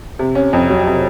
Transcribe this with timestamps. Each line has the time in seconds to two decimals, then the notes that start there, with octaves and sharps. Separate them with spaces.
0.19 C3
0.35 C#4
0.53 F2
0.70 F#3
0.86 C3